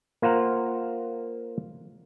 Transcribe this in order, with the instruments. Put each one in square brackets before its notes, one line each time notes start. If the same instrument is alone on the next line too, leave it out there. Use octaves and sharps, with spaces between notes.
[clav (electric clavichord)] A#3 F4 C5 F#5 A#5